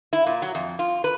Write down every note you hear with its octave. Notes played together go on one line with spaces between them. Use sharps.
E4
A#2
F#3
F2
F4
B4